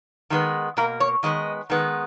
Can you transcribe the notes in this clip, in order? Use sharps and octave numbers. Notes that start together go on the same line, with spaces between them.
D#3 G#3 B3
B2 A#3 A#4
C#5
D#3 G#3 B3 D#5
D#3 G#3 B3